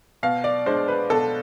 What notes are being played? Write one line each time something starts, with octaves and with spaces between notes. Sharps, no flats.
B2 F5
D5
G#3 D4 C5
B4
B2 A4